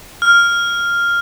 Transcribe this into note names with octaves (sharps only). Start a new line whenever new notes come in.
F6